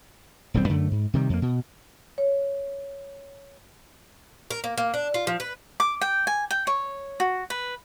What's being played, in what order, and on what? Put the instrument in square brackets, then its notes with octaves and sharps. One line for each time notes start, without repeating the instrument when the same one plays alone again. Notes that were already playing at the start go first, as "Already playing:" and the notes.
[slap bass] D#1 B1 G3 C4
F#2 D3 A3
G#2
C3 D#3 G3
F2 A#3
B2
[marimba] C#5
[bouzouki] A#4
A#3
A#3
D4
F4
F3
B4
[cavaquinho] D6
G5
G#5
G5
C#5
F#4
B4